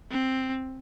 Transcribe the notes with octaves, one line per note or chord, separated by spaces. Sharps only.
C4